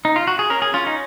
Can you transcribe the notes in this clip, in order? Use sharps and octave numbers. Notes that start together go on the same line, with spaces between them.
D#4
F4
F#4
G#4
C#4 A#4
G#4
C#4 F4
D#4